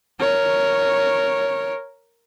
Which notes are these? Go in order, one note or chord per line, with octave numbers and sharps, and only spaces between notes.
A#4 C#5